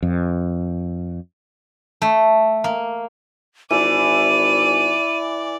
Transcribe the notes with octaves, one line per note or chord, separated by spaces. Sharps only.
F2
A3
A#3
G#1 E3 D5 D#7